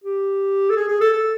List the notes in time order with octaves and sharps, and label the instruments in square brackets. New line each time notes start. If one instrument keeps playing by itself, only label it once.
[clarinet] G4
A4
G#4
G#4
A4
A4